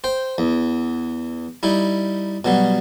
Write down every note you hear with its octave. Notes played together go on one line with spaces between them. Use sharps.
C5 G5
E2
G3 D#4 E4
B2 F#3 G3